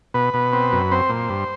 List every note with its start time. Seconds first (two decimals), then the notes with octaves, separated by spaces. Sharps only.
0.14 B2 B4
0.34 B2
0.53 C4
0.72 F#2
0.91 C4 C5
1.10 A#2
1.30 G2